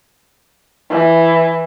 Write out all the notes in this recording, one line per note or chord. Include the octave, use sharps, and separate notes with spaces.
E3